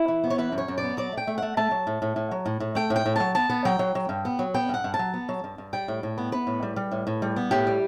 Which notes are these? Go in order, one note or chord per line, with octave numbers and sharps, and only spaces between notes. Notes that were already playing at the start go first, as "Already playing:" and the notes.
Already playing: E4
E3
B3
C#5
E3 B4
F#2
C#5
F#2
D5
B3
F#3 D5
A3
G5
A3
A3 F#5
A3 A5
F#3
A2
A2
A2
F#3
A2
A2
A3 G5
A2
G5
A2
F#3 A5
B3 A5
B3
F#3 G5
F#3
F#3
G2
B3
F#3
B3 G5
G2 F#5
G2
A5
F#3
B3
F#3
G2
G2
G3 G5
A2
A2
B3
B3 B4
A2
G3
G3
A2
A2
G3
B3
A2 G4
G3